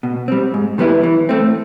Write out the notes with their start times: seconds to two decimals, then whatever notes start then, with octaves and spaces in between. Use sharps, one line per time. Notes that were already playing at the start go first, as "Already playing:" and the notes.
0.03 B2
0.28 G3 C4
0.54 G#2
0.78 D#3 G3 B3 E4
1.03 E3
1.29 A3 C4